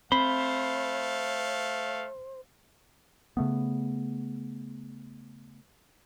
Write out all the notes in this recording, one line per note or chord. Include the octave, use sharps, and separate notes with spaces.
A3 C4 C5 F5 B5
C#3 A3 B3